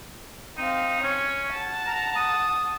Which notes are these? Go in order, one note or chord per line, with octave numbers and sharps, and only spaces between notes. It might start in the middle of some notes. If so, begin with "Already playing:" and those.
C4 D#4 F5
C#4 C#5
F#5 A5
A#5
D#6